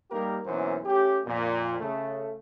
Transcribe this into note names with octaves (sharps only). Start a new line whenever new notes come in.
G3 A#3 D#4 G4 A#4
B1 F#2 E3 A#3 C5
A3 C#4 G4
F2 A#2
C#3 A3